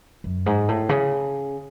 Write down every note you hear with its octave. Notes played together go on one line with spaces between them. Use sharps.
F#2
G#2
A2
C#3